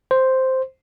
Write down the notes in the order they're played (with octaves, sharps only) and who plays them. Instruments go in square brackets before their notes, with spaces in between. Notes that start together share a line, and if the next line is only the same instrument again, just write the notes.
[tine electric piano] C5